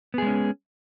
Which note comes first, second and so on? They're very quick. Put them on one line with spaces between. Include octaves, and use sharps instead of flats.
B3 G#4 G#3 C#4